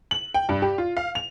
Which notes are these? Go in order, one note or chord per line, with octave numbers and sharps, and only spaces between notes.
F#7
G5
G2
G4
F4
F5
F7